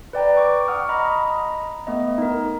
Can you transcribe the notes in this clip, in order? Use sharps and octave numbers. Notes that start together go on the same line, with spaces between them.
B4 D5 G5 A#5
G5 C#6 D6
F#5 C#6 D#6 F6
D#5 A#5 B5
A3 B3 D#5
D#4 A#4